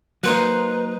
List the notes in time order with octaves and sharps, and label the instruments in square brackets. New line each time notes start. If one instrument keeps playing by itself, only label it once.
[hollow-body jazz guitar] F#3 A#3 [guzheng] D#4 C5 F#5 [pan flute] B4